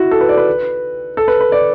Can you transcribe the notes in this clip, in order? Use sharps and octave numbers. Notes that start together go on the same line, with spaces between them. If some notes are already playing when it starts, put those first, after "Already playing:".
Already playing: E4 F#4
A4
B4
D5
B4
A4
B4
B4
D5